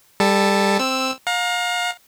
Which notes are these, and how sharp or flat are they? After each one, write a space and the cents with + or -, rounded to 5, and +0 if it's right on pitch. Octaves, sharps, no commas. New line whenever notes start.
G3 +20 A4 +0 A5 +0
C4 +0 E6 +0
F5 +35 A#5 +5